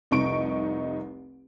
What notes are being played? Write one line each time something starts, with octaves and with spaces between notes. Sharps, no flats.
F1 C2 D#4 D#5 C#6 D7